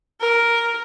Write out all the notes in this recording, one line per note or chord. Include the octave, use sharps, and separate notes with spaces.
A#4